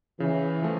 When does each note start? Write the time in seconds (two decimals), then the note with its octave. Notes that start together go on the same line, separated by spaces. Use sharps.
0.20 C#3 E3
0.62 F3 A3